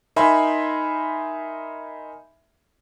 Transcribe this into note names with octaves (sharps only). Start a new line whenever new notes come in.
D#4 A#4 E5 G#5 B5 C6